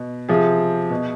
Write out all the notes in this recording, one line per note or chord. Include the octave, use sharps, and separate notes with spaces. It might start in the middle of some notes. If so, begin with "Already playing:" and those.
Already playing: B2
C3 F3 G#4
B2